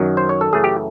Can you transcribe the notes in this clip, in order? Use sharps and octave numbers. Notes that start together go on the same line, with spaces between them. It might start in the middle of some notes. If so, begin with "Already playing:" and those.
Already playing: F#2 D#3 F#3
C5
C#5
A4
F#2 C#3 E3 A3 G#4
G4